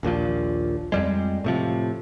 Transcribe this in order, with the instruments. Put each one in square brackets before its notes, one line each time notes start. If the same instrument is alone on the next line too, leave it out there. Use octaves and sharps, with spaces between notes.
[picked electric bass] A#1 D#2 A#2 F3
F2 G3 G#3
A2 C3 F3